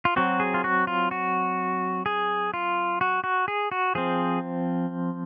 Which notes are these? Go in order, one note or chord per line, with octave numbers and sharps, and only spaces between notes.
F4
F#3 C4 F#4
G#4
F4
F#4
F4
F#4
G#4
F4
F#4
F#4
G#4
F#4
F3 C4 G#4